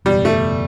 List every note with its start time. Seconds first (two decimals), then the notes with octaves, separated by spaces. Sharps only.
0.05 F#1 E2 B2 G3
0.25 A3